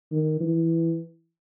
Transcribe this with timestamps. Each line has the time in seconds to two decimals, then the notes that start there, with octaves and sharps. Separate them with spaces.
0.12 D#3
0.40 E3